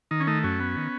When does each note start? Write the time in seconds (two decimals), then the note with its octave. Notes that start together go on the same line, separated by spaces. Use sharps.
0.11 D#3 D#4
0.20 C#4
0.27 A3 D#4
0.44 F#2 C#4
0.60 B3
0.77 D#3